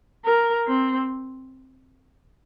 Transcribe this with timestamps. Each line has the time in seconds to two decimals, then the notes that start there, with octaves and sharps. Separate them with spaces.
0.25 A#4
0.67 C4